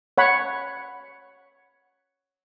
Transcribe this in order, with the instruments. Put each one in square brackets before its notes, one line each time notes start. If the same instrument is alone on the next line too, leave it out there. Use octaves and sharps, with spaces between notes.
[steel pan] C#5 F#5 B5